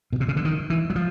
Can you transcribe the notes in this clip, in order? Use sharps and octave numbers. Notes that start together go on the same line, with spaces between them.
B2
C3
C#3
D3
D#3
E3
F#3
F3